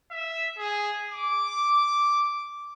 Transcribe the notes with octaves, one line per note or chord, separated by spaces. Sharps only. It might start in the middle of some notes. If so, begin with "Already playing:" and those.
E5
G#4
D6